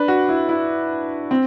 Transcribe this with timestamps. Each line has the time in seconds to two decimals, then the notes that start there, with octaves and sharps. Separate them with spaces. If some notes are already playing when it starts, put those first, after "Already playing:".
Already playing: D4 B4
0.08 F#4
0.29 E4
0.49 E4
1.31 C4